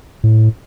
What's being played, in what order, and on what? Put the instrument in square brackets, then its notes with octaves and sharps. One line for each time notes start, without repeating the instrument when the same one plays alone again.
[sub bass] A2